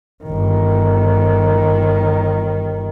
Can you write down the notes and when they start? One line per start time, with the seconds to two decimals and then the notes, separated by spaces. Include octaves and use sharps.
0.24 G1 D#3